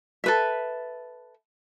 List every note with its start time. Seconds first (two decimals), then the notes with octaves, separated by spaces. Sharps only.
0.24 A4 B4 E5